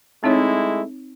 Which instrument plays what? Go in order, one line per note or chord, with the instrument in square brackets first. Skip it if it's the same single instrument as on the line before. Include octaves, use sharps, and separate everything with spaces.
[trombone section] G#3 A3 E4 [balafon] C4 D#4 C#5